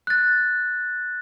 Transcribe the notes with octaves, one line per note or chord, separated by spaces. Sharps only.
F#6 A6